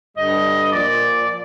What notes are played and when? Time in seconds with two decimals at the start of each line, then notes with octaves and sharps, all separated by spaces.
0.17 G2 D3 G3 D#5
0.72 A#2 F3 D5